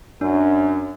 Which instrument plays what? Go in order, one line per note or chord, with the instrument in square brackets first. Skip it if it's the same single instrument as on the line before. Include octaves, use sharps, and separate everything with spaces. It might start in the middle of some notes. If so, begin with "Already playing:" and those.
[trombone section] F#2 [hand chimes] D4